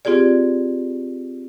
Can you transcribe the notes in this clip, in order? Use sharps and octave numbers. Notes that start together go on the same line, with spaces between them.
C4 F4 G4 G#4 D5